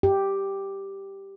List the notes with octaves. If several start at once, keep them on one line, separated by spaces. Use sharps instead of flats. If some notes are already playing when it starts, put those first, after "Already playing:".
G4